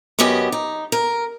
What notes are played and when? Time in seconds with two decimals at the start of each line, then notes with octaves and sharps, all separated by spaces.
0.19 F#2 B3 C#4 G4 D#5
0.52 D#4
0.92 A#4